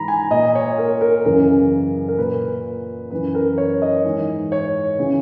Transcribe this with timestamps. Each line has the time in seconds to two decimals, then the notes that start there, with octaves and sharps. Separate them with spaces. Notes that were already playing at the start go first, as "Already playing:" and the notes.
Already playing: G#2 E3 A#5 B5
0.08 G#5
0.31 A#2 D#5
0.55 C#5
0.78 A#4
1.01 A#4
1.25 F#2 C#3 E3 A#4
2.08 A#4
2.18 A#2 B4
3.11 F#2 E3 B4
3.35 A#4
3.58 C#5
3.82 D#5
4.05 G#2 E3
4.52 C#5
4.99 C#3 E3